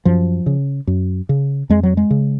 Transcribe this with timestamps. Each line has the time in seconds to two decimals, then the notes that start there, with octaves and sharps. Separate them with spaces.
0.05 F#2 F3
0.46 C#3
0.87 F#2
1.29 C#3
1.69 F2 G#3
1.83 F#3
1.97 G#3
2.10 C#3